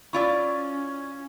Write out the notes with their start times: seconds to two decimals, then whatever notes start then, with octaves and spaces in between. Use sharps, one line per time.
0.13 C#4 E4 F4 D5 C#6 E6